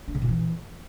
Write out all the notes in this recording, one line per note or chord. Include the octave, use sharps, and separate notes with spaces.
D4
C#3
A#2
E3